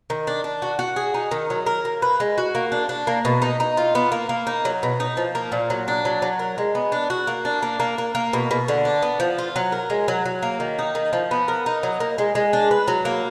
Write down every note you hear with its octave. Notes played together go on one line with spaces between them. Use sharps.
D#3
D4
D4
F#4
F#4
G#4
D#4
D#3
F#3
A#4
A#3
B4
G#3
F#4
A#3
D4
D4
A#3
B2
D#4
D#4
F4
B3
A#3
A#3
D#4
F#3
B2
D#4
F3
A#3
A#2
F#3
D4
F#3
F#3
A#4
G#3
B3
D4
F#4
A#3
D4
A#3
A#3
A#3
A#3
B2
B2
D3
D4
B3
F3
F4
F#3
A#4
G#3
F#3
F#3
A#3
D#3
D#4
D#3
F3
B3
A#4
D#4
F#3
A#3
G#3
G#3
D4
B4
F#3
A#3